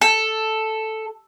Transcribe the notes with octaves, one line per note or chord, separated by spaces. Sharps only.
A4